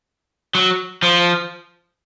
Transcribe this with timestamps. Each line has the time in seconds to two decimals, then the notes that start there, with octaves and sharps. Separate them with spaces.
0.55 F#3
1.02 F3